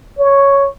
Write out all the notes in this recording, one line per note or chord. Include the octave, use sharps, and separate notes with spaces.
C#5